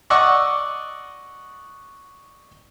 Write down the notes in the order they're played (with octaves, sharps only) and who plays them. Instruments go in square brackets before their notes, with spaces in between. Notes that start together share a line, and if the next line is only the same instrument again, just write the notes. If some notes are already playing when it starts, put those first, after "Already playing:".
[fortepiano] D5 D#5 F#5 C#6 E6